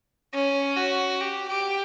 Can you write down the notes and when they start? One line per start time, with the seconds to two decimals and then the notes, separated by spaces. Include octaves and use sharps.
0.34 C#4
0.76 F#4
1.21 G4
1.49 G4